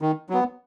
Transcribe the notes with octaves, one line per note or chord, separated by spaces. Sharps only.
D#3
F#3 B3